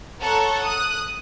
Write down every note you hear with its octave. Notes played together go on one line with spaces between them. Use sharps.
A4 C#5 F#5 A#5 C#6 F#6
D#6 F#6